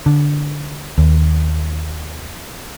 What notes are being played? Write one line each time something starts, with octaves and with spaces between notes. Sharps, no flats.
D3
D#2